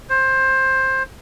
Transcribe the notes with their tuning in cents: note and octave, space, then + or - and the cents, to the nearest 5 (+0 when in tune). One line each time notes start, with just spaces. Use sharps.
C5 +15